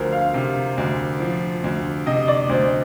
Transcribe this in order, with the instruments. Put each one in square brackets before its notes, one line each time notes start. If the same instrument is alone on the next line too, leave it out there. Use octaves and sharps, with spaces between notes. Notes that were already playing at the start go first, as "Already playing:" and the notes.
Already playing: [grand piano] D2 F3 [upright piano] A#4 C5
[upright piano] F5
[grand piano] C3
D2
F3
D2
[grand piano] C3 [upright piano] D#5
[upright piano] D5
[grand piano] D2 [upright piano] C5